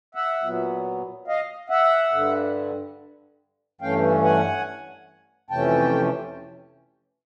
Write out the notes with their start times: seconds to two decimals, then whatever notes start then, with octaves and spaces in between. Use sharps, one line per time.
0.15 E5 F#5
0.43 A#2 F#3 B3
1.28 D#5 F5
1.70 E5 F#5
2.12 G2 D3 G3
3.81 G2 E3 A3 C#4 F5 G5
4.23 F#5 G#5
5.50 F2 C3 E3 A3 C#4 G5 A5